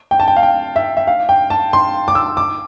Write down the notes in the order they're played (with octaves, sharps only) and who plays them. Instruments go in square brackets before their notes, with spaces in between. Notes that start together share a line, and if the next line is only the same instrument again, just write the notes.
[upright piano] G5
A5
G5
F5
G5
E5
E5
F5
G5
A5
C6
D6
E6
D6